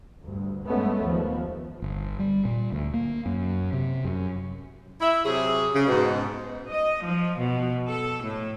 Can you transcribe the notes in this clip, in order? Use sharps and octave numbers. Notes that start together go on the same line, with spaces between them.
D2 G2
G2 G#3 A3 B3 C#4
D#2 F3
G1
G3
A#2
D2
A#3
F#2
C3
F#2
E4 E5
C3 F#3 G#4
C#3
G#2 B2
D#5
F3
B2
A4
A2